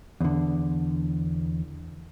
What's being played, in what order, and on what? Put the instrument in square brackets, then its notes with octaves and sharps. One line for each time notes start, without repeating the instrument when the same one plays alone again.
[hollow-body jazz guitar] E2 D3